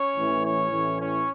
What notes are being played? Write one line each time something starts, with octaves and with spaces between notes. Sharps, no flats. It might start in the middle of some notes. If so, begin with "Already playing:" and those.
Already playing: C#4 C#5
A1 A2 E3
C#4 C#5
A1 A2 E3
C#4 C#5